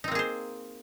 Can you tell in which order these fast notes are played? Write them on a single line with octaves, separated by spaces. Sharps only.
D#4 C4 A#3 G#4 C5